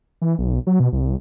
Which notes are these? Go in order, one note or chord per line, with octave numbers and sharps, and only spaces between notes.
E3
B1
F#3
B2
C2